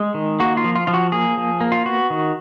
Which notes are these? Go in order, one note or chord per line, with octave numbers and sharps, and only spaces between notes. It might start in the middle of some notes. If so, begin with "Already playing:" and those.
Already playing: G#3
D#3
A#3 F#4
F4
F3
F4
F3 F4
F#4
A#3 G#4
F3
A#3
F4
B3 F#4
D#3